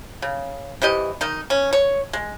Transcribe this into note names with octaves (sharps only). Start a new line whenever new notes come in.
C#3
C3 E3 G4 D#5
D#3 D#4
C#4
C#5
G#3